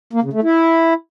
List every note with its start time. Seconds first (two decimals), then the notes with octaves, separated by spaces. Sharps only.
0.13 A#3
0.23 C#3
0.33 A3
0.43 E4